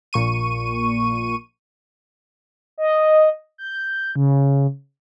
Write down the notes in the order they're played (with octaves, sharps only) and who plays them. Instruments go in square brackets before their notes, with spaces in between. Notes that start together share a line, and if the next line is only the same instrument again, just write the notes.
[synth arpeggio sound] A#1 A#2 C#6 D#7
[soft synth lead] D#5
G6
C#3